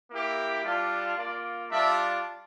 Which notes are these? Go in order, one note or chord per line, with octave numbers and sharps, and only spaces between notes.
A#3 E4 G4
G3 D4 F4
A#3 F4 D5
G3 D4 F4 E5